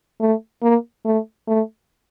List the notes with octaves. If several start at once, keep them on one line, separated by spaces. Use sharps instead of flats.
A3
A#3
A3
A3